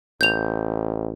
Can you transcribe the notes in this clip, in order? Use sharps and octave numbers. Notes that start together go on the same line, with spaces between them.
A1 G6 F7